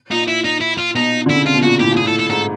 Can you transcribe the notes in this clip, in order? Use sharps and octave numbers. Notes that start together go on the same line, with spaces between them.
A#2 D#4
E4
D#4
E4
F4
B2 D#4
D3 E4
C#3
C3 F4
B2
A#2 F#4
A2 G4
A#2
G#4
A2 A4
A4
G#2 A4